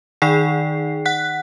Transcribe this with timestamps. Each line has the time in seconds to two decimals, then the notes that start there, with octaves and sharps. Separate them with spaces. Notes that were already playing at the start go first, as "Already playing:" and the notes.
0.22 D#3 D#4 G#4 D5 G5 C7
1.05 F#5 F#6 B6